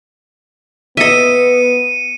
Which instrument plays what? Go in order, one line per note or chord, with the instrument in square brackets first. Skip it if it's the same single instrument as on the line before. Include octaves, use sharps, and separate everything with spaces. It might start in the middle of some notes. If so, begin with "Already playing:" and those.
[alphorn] B3 [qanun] D#5 E5 [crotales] C#7 D#7